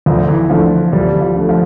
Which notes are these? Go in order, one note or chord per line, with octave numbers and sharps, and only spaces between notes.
D2 F3
E3
D3 F3 A3
D2 G3
F3
D3 A3
F3